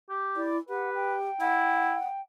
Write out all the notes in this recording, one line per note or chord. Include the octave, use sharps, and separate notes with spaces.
G4
E4 D5
G4 B4 F#5
G5
E4 F#5